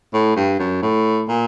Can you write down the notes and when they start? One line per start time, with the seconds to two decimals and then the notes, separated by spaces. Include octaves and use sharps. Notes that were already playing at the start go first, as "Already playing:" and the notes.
0.14 A2
0.36 G2
0.59 F#2
0.82 A2
1.28 A#2